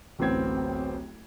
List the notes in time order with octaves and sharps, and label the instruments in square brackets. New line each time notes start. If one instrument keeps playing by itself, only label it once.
[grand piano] D1 A1 B3 C4 G#6